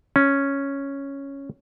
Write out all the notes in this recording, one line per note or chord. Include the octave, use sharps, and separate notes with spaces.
C#4